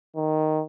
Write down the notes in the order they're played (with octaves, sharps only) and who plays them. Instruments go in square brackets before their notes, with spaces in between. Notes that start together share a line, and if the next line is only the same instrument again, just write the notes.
[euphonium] D#3